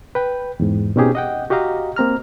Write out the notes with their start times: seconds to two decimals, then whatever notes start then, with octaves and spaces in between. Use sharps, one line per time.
0.15 B4 G5
0.60 E2 G#2
0.96 B2 C4 C#4 D#4 G4 G#4
1.15 D#5 F#5 G5
1.50 F#4 G4 D#5 F5 A#5
1.96 A#3 C4 A#5 F6